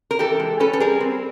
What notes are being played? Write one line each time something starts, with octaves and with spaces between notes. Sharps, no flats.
A#4
E3 G4 A4
G#3
C#4 A4 B4
A4
G3 G#4 A#4
C4